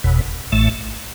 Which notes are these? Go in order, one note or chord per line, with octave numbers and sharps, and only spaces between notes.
F#1 E2 B2
A1 A2 A3